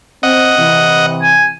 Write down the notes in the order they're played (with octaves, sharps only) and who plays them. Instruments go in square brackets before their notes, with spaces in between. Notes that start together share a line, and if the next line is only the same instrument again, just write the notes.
[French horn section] C4 [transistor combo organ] D#5 F#5
[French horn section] C3 E3
[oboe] G#5